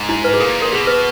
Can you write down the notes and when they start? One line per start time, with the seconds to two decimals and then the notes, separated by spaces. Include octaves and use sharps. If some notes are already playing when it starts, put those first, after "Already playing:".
Already playing: G#2
0.09 E4
0.24 B4
0.33 G#4
0.40 A#2 A#4
0.62 A#4
0.72 B2 G#4
0.87 B4